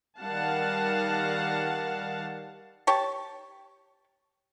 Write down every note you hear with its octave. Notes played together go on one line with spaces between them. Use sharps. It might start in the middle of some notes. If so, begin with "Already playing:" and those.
D#3 G3 F5 F#5 A5
G4 C#5 A5